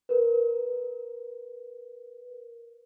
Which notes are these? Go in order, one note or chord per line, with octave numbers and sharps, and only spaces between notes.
A#4 B4